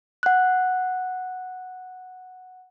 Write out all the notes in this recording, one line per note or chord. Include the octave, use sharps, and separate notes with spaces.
F#5 F#6